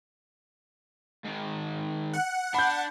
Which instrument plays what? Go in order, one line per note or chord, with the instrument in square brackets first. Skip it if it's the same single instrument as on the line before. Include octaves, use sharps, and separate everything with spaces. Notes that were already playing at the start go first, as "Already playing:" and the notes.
[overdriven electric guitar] G#2 D#3
[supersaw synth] F#5
[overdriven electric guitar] D4 [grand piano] B5 G6